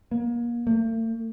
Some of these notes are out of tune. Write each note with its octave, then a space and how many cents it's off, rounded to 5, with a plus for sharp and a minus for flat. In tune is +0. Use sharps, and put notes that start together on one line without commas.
A#3 +30
A3 +45